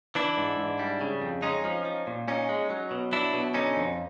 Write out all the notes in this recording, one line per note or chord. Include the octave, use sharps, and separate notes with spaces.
E3 D4 E4
G#2
G#2
G3
C#3
F2
G#3 C#4 D#4
F3
F3
A#2
A#2 C#4 D#4
G#3
F#3
B2
F#3 D4 E4
B2
D3 C#4 D#4
F2